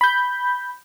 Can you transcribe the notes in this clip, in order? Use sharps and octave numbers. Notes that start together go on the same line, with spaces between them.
B5 G6